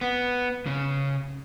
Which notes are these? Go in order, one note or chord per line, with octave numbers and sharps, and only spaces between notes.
B3
C#3